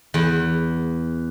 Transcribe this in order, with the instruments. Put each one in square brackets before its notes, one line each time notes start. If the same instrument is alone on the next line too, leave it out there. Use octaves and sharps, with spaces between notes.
[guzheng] E2